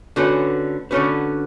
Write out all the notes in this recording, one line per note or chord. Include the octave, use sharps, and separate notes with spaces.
D3 A3 C#4 F#4 B4
D3 A3 C#4 F#4 B4